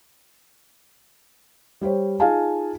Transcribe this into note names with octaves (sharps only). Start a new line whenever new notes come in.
G3 G4 C5 C#5
D#4 F4 G#4 F5 G#5 A5